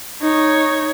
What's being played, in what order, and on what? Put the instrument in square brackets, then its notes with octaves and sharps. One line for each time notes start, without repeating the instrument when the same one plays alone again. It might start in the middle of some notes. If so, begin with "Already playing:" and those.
[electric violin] D#4 C#5